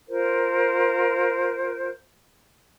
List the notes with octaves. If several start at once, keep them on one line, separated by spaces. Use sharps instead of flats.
F4 A#4 C5